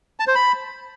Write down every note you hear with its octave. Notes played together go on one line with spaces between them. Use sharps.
A5
C5
B5